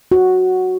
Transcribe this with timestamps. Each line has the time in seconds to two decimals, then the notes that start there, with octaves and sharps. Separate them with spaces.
0.11 F#4